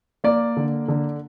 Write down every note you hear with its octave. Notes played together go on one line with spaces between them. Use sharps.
A#3 D5
D3
D3